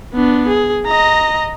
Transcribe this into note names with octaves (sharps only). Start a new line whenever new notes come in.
B3 D4
G#4
D#5 A#5